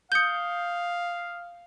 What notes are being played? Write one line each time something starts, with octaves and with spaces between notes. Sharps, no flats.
F5 D#6 G6 C#7 G7